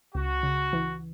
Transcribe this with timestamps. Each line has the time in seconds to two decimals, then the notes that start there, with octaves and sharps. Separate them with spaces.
0.15 C#2 F#4
0.43 C#3
0.73 E3